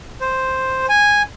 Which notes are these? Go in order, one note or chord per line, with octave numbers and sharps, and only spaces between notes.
C5
G#5